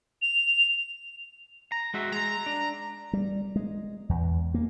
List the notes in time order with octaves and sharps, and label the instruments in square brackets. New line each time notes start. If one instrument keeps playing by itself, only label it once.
[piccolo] F7
[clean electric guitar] A#5
G#3 F#4 E5
[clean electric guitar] G#3 [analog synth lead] A#5
[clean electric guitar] D4
[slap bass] G3
G#3
E2
A#3